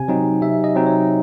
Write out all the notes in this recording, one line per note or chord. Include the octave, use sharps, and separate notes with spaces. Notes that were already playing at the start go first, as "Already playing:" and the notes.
Already playing: C3 G#5
F#3 C4 D#4
C3 E5
D#5
F#3 C4 D#4
C#5